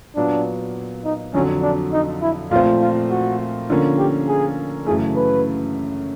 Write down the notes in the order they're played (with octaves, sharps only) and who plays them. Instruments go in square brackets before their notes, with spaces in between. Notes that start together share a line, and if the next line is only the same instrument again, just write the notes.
[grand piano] A#2 F#3 B3 [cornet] D4
[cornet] D#4
[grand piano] F2 D3 F#3 [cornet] C#4
[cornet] D4
D#4
E4
[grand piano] A#2 F3 A3 C4 [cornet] F4
[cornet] F4
F#4
[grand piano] D3 F3 A#3 C#4
[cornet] G4
G#4
[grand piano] F#2 C#3 E3 A3 [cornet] G#4
[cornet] B4